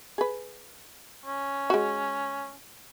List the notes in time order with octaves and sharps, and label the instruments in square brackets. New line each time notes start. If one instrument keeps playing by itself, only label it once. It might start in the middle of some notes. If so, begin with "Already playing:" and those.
[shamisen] G#4 B4
[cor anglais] C#4
[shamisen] G#3 F#4